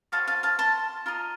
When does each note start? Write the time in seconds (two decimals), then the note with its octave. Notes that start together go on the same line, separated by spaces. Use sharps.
0.12 F#4 C5 D#5 F5 A5
0.27 F5 A5
0.43 F5 A5
0.59 A5 C6
1.06 F4 A#4 D#5